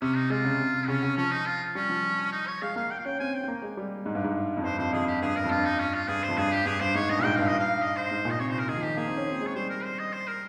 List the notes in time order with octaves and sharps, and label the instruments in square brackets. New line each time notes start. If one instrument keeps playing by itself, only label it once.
[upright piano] C3 [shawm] C#4
[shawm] D#4
[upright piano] G#3 [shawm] F4
[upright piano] C#3
C3
C3
[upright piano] C#3 [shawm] C#4
[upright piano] C#3
[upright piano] F3 [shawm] C#4
[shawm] D#4
F4
[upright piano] G3 [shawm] C#4
[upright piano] F3
[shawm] D#4
C#5
[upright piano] G#3 [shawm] F5
[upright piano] A#3 [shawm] F5
[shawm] G5
F5
[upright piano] C#4 [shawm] G5
[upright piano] C4 [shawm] G#5
[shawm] G5
[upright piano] C4
A#3
G#3
G3
G#2
G2
G#2
F2
[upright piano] G2 [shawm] C5
[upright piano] F2 [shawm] C5
[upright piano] F2 [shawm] G#4
[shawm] G4
[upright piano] G2 [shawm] G#4
[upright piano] G2 [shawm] A#4
[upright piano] F2
[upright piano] G2 [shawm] F4
[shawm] D#4
C#4
F4
[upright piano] G2 [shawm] G#4
[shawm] C5
[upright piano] F2
[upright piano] G2 [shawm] G#4
[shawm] G4
[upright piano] G2 [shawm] G#4
[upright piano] G2 [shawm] C5
[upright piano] G#2 [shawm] C#5
[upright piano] G2 [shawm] D#5
[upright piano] A#2
[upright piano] G#2 [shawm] G5
[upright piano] G2 [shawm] F5
[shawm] D#5
[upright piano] G2
[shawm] F5
D#5
C5
[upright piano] G#2
A#2
[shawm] D#5
[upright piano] C3 [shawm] C#5
[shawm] C5
A#4
[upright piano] D#3 [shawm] G#4
[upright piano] F3
[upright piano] D#3 [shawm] G4
[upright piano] A#3 [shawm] G#4
[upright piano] C4
C#4
C4
G#3
[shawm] C#5
[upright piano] G3 [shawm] C5
[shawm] A#4
C5
D#5
C5
A#4